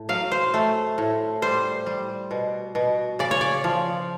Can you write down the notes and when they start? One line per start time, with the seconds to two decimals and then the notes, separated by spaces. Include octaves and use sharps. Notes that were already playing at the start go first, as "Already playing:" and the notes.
Already playing: A2
0.09 F#3 F5
0.32 C5
0.54 A3
0.98 A2
1.42 G3 C5
1.86 G3
2.31 B2
2.75 B2
3.19 C#3 D5
3.31 C#5
3.41 D5
3.64 F3